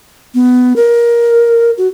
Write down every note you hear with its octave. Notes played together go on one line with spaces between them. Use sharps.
B3
A#4
F#4